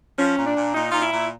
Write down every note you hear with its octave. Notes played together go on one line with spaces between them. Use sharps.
F3 C#4
A#2
D4
A#2
A#2 D#4
A#2 F4
E4
A#2